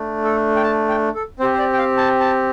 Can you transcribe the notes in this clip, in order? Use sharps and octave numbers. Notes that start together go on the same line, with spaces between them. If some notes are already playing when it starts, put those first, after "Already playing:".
Already playing: A3 D4
A4
G5
A5
G5
A4
C4 G4 C5
C5
D5
G5
F5
A5
A5